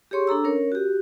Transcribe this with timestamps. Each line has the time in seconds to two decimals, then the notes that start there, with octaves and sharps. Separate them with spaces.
0.11 G4 G#4 C#5 C6 C#6
0.27 D4 A4 A#5 E6
0.44 C#4 A#4 C#5
0.72 F#4 G4